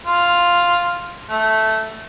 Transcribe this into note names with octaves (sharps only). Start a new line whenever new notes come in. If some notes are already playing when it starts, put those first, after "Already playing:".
F4
A3